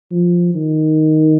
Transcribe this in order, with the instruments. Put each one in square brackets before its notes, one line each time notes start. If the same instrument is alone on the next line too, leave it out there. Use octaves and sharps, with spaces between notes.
[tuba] F3
D#3